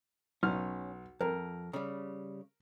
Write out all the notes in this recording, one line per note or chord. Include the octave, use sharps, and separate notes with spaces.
B1 C#4 F6
F2 A#4
C#3 G3